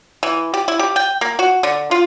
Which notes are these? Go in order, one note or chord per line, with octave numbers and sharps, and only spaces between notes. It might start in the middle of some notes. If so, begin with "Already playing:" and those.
E3
G4
E4
G4
G5
A#3
F#4
D3
F4